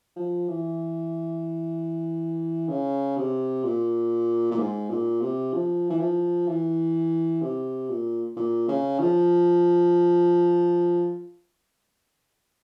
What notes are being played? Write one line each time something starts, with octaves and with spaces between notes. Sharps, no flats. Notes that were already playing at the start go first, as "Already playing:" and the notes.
F3
E3
C#3
C3
A#2
A#2
G#2
A#2
C3
F3
E3
F3
E3
C3
A#2
A#2
C#3
F3